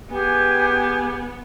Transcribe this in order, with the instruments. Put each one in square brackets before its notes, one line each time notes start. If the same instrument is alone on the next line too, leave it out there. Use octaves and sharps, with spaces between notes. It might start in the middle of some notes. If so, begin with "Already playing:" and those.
[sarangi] B3 [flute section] G4 G#4 G#5